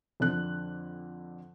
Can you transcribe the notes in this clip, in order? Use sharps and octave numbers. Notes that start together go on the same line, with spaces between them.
F2 D3 F#6